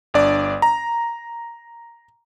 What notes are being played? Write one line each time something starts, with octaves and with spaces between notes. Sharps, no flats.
G1 D4 D5
A#5